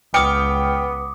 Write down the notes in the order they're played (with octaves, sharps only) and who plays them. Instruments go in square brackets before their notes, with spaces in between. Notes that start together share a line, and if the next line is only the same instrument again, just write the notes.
[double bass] C#2 [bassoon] B3 [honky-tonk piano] G5 F6 C#7 [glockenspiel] D6 D#6